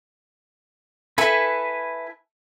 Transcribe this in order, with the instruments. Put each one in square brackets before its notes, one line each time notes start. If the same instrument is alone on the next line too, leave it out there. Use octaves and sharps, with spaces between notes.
[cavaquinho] E4 A4 [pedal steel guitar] B4 G#5